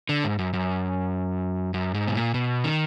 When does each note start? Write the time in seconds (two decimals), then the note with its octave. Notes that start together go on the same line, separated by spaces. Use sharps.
0.09 D3
0.24 G#2
0.39 F#2
0.53 F#2
1.74 F#2
1.94 G#2
2.08 B2
2.15 A#2
2.34 B2
2.64 D#3